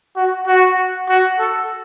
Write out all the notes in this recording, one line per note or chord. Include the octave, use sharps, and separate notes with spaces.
F#4
F#4
F#4
A4